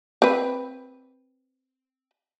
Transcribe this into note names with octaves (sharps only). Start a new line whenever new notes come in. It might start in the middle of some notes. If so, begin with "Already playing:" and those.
C4 B4